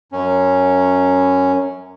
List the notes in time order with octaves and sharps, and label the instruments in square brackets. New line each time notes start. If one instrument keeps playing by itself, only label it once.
[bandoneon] F#2 C#4